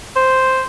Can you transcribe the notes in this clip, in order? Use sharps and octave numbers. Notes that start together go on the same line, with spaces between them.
C5